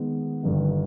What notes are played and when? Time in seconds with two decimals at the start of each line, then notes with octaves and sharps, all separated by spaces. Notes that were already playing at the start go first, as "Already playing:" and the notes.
Already playing: D#3 G#3 B3
0.43 G1 G2 D#3